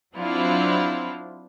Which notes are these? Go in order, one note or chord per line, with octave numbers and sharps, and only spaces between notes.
F#3 C4 D4 E4 F4